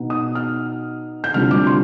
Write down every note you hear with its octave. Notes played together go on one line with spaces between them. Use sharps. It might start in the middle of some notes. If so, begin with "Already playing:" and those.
Already playing: B2 B3 D#4
D#6
F6
G6
D2 C3 G3 D4 F4 F6
D6
C6